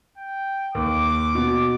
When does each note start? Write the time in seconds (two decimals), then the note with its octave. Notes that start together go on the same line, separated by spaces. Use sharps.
0.18 G5
0.75 D#2 D6
1.35 B2